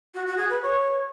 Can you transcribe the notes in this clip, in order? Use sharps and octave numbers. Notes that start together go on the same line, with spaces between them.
F#4
F#4
G#4
B4
C#5